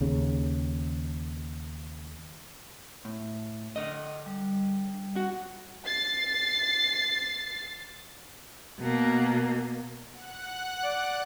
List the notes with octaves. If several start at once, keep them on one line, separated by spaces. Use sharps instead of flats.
D#2 C#3
A2
D3 D#5
G3
F#4
A6 C7
B2 A#3
F#5 F#6
D5